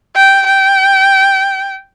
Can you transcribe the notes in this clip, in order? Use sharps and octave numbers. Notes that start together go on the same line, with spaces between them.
G5
G5